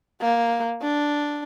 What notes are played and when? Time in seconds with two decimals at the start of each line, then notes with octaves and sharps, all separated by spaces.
0.21 A#3
0.82 D4